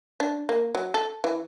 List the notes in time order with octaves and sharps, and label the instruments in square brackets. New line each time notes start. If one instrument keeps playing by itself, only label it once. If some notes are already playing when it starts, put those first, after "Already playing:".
[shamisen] D4
A#3
F#3
A4
E3